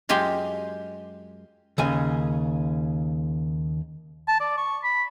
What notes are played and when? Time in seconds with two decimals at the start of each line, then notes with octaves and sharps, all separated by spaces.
0.09 F#2 G#3 F4 G4 A5 C6
1.78 D#2 C#3 G#5
4.28 A5
4.40 D5
4.58 C#6
4.84 B5